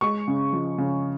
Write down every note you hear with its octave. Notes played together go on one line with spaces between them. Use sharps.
G#3 C#6
C#3
F3
C#3